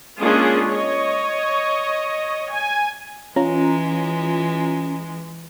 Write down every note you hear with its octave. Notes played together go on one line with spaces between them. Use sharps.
G#3 A#3 C#4 D4 F4 G#4
C#5 D#5
G#5
E3 G#3 C#4 F4 A#5